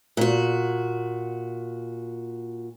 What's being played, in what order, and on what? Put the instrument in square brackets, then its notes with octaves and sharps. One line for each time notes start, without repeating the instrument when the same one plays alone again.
[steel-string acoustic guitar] A#2 F#4